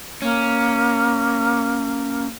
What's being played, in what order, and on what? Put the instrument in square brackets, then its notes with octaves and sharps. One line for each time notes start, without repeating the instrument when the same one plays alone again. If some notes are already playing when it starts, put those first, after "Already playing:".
[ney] A#3 [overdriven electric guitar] C#4